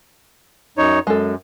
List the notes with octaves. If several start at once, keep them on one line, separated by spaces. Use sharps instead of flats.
F#2 D#4 C#5
F#2 G#3 A4